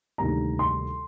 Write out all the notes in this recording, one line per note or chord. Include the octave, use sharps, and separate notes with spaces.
D2 C3 D#3 G3 A#3 A#5
C6